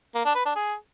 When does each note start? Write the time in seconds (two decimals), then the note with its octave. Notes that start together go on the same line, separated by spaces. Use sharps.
0.15 A#3
0.25 D4
0.35 B4
0.45 D4
0.56 G#4